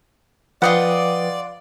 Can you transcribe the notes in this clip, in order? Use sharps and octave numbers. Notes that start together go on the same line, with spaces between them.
F3 F4 B4 D5 D#5 F#5 G5